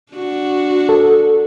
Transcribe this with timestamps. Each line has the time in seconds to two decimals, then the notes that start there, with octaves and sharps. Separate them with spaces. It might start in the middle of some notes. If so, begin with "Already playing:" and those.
0.12 D4 F#4
0.89 A4